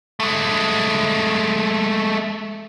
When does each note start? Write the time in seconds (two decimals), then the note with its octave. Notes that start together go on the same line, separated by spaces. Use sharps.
0.20 G#3 A3